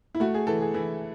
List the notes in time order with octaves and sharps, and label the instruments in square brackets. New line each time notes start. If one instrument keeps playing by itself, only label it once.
[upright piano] E4
A3 F#4
G#4
E3 A4
G#4
E3 E4